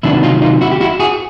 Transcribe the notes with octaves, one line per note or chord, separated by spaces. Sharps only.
C3 D#3 F#3 B3 D4 E4
D#4 F4
D#4 F4
E4 F#4
G4
E4 F#4
F#4 G#4